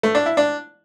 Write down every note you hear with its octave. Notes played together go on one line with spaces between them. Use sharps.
A3
D4
E4
D4